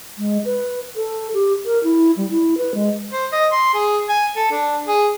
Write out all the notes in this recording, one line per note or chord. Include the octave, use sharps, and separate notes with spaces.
G#3
B4
A4
G4
A#4
E4
G3
E4
B4
G#3
C5
D#5
C6
G#4
G#5
A4
D4
G#4